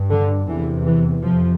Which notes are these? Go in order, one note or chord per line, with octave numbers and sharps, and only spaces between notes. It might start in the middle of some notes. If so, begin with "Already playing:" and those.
Already playing: G2
D3
E2 C3 E3
E3
F2 C3 F3